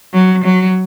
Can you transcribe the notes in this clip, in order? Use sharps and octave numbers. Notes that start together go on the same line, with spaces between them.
F#3
F#3